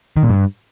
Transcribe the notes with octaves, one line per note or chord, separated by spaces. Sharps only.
D#3
A#2
G2